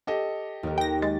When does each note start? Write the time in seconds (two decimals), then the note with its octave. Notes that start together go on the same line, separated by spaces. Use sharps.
0.07 G4 A4 D#5
0.63 D#2 A#4
0.78 G5 A#6
1.02 G#3 A6